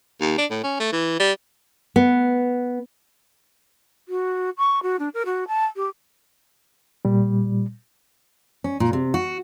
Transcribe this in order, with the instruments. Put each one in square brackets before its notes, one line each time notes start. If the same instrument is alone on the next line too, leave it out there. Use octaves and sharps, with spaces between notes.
[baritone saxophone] D#2
D4
A2
C#4
A3
E3
G3
[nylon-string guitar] B3
[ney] F#4
C#6
F#4
D4
A#4
F#4
A5
G4
[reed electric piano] A#2 G3
[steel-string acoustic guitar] C#4
A#2
C3
F#4